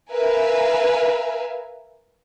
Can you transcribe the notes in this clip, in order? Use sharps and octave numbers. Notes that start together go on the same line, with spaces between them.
A#4 B4 E5 F5 G#5